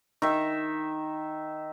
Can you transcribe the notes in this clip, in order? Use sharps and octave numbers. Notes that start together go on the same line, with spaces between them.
D#3 E5